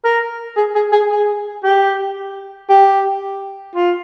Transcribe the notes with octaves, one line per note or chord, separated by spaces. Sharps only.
A#4
G#4
G#4
G#4
G#4
G4
G4
F4